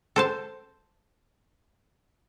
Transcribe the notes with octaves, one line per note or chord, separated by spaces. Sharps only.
A4 C5 A5